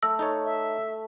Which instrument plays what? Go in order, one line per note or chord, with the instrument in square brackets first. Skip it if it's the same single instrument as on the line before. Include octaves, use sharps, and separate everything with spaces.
[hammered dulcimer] A3 [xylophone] E6
[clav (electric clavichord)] D#4 A4 C#5
[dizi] E5